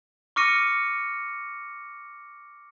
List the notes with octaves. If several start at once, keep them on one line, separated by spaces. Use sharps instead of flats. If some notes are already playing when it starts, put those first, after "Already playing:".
C#6 D6 F6 A#6 C#7 D#7